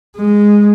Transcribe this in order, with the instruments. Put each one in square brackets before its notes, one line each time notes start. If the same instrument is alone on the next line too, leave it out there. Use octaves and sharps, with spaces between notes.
[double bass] G#3